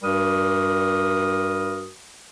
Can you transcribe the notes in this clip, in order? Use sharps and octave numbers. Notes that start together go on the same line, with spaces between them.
G2 G3 F#4 A#4 D#6